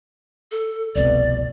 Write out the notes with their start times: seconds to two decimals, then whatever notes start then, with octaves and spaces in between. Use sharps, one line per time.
0.51 A4
0.95 F1 C2 B2 D5